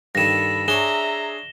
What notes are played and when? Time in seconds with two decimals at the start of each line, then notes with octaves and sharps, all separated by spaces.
0.15 G2 D#3 A4 B5 A#6 E7
0.68 D4 G#4 C#5 E5 A#5 E7 G7